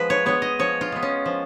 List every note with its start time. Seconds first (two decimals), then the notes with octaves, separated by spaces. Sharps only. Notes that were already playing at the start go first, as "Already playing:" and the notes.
Already playing: F3 G#3 B3 B4
0.10 C#5
0.26 G#3 B3 C#5
0.42 D#5
0.59 F3 C#5
0.81 F4
0.92 G#3 B3
1.02 C#4
1.26 F3